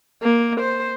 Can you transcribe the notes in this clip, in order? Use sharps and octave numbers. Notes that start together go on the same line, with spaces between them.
A#3
C5